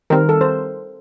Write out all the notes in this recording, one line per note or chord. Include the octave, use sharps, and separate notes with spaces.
D#3 G3 C4 A#4
A4
C5